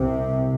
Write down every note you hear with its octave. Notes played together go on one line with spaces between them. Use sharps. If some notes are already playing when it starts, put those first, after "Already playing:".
Already playing: C2 C3